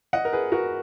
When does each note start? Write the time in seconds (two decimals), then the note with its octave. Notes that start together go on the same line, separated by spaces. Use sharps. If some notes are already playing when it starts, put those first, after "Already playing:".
0.13 D#5 F#5
0.25 A#4
0.32 G#4 B4
0.52 F#4 A#4